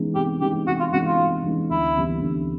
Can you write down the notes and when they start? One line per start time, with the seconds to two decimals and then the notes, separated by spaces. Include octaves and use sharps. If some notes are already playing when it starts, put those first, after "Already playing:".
Already playing: E3 G#3 B3 D#4
0.15 C3 G4
0.40 E3 G#3 B3 D#4 G4
0.67 C3 F#4
0.80 F4
0.92 E3 G#3 B3 D#4 F#4
1.05 F4
1.19 C3
1.44 E3 G#3 B3 D#4
1.70 D2 E4
1.97 C3 E3 G3 B3
2.22 D2